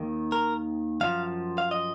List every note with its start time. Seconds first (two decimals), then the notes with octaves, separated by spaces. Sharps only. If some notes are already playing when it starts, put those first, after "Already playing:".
Already playing: D#2 D#3
0.32 A#4
1.01 F#2 F3 F5
1.58 F5
1.71 D#5